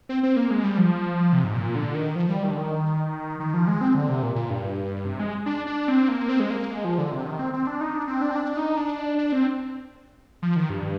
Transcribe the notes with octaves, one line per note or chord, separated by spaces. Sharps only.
C4
C4
A#3
G#3
G3
F3
C3
G#2
A#2
D3
D#3
F3
G3
D#3
D3
D#3
D#3
F3
G#3
C4
D3
C3
A#2
A#2
G2
C3
G#3
D4
D4
C4
A#3
C4
G#3
A#3
G#3
F3
D3
C3
D#3
C4
C4
D4
D#4
D4
C4
D4
C4
D4
D#4
D4
D4
C4
F3
D#3
G2